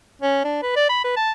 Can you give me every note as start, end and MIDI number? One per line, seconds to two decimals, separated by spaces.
0.22 0.42 61
0.44 0.60 62
0.63 0.72 71
0.76 0.88 74
0.89 1.03 83
1.04 1.15 71
1.16 1.32 81